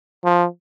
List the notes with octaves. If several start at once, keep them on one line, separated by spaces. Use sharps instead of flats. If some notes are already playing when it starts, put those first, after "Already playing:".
F3